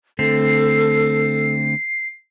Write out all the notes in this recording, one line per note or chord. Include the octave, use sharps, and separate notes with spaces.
D3 A3 C4 A4 C7